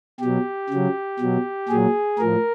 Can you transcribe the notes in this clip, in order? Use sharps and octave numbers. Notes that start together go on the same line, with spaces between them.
B2 F#3 G4
C#3 F#3
B2 F#3
A#2 F#3 G#4
A2 F3 A#4